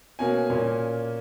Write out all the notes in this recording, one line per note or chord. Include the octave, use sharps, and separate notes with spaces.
B2 A#3 C#4 G#5
A#2 A#3 C#4